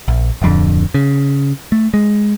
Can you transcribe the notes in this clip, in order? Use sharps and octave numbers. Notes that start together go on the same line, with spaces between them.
A#1
D1 F2 D3
C#3
A3
G#3